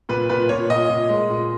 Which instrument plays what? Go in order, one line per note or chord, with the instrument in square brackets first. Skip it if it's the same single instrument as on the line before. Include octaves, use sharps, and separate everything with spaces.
[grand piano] A#2 B4
A#2 B4
A#2 C#5
A#2 D#5
A#2
G#3
A#2